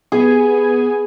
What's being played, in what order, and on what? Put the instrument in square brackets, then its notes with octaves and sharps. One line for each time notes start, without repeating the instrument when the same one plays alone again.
[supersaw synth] B3 G#5 [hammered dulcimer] G#4